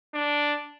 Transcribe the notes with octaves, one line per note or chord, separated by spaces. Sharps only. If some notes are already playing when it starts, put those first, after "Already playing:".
D4